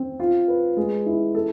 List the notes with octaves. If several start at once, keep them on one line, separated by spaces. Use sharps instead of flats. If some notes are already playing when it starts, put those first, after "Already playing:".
Already playing: C4
F4
B4
G#3
E4
A4